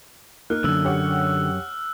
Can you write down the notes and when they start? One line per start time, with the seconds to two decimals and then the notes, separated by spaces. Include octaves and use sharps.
0.50 A#3 D#4 F6 F#6
0.64 C2 F#2 D3 E6
0.85 G4 C#5 F#5